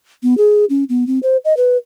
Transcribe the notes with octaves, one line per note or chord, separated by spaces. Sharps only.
B3
G#4
C#4
B3
C4
C5
D#5
B4